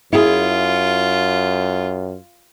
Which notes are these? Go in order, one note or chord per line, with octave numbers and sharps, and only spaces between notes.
F#2 E4 F4 G#4